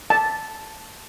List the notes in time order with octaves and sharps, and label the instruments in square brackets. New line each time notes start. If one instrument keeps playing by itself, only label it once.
[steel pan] A5